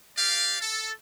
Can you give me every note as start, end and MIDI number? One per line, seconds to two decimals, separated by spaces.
0.17 0.57 67
0.17 0.57 74
0.17 0.57 77
0.61 0.90 69